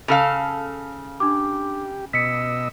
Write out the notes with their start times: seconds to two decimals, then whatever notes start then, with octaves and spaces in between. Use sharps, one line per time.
0.08 C#3 A4 F5 F7
1.20 D4 G4 D6
2.13 B2 D#5 E6 B6 C#7